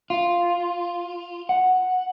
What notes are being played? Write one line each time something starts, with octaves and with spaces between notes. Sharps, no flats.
F4
F#5